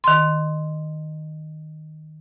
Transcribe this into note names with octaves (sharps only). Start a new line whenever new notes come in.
D#3 C6